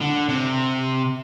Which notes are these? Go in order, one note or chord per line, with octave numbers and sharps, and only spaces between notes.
D3
C3